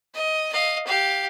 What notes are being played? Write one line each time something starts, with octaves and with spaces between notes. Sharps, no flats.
D#5
D#5 F5
G4 F5